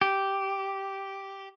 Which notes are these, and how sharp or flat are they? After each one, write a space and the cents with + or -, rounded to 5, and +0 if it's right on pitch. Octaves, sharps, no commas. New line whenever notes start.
G4 -5